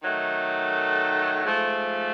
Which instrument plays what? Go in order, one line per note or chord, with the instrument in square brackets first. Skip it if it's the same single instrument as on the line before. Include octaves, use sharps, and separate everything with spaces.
[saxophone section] D#3 F#3 A3
G#2 F3 A3